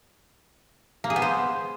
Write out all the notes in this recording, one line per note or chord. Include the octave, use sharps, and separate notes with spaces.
A#3
G#4
B3
C5